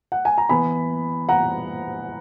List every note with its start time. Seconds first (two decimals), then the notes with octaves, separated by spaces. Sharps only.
0.12 F#5
0.25 G#5
0.38 A#5
0.49 E3 B3 E4 G#5 B5
1.29 F#5 A#5